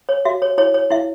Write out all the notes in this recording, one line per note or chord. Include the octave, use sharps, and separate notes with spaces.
C#5
F#4 E5
C#5
E4 C#5
C#5
E4 E5